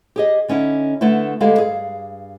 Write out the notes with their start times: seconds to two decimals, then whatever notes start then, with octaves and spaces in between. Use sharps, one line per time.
0.16 G4 G#4 D#5
0.48 D3 C#4 D#4 E4
1.01 D3 A3 B3 E4
1.40 D2 G#3 E4 G4 A4 F5
1.58 G2 G#4 F5